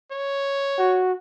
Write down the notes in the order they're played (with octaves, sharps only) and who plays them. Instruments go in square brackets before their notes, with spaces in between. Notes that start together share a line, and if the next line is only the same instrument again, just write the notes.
[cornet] C#5
[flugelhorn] F#4